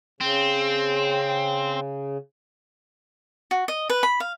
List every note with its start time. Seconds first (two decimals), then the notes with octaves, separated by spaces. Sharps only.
0.21 C#3 C4
3.51 F#4
3.68 D#5
3.90 B4
4.03 B5
4.20 F5